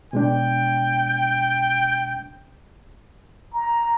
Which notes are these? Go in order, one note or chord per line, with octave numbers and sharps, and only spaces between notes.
B2 G#3 D4 G5
A#5